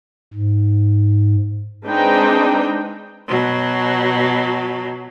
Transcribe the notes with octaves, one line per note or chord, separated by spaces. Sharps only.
G#2
G#3 C4 D4 D#4 B4 G5
B2 F#3